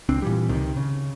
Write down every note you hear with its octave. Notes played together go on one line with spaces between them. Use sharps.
C#2 C4 D4
A#2 E3 G3
C#2 C3 D#3
C#3